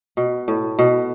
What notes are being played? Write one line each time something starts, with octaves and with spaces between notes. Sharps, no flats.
B2
A2
B2